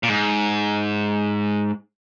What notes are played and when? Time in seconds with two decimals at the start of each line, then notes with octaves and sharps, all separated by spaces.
0.03 A#2
0.08 G#2